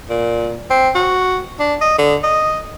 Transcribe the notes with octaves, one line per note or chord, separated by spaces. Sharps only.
A#2
C4
F#4
D4
D#5
D3
D#5